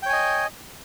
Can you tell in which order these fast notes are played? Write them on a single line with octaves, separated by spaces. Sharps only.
G5 C#5 G#5 D#5